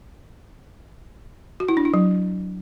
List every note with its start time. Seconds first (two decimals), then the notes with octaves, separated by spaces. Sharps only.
1.60 F#4
1.68 E4
1.77 D4
1.85 E4
1.94 F#3